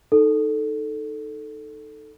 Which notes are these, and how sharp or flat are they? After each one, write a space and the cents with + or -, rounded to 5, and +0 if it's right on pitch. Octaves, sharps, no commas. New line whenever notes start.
D#4 -5 A4 +0